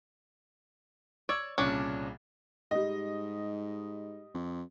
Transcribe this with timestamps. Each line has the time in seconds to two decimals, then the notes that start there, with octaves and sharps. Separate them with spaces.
1.29 C#5 D5 E6 G#6
1.58 C2 A#2 C#3 C#4 D4
2.71 G#2 G3 D#5
4.34 F2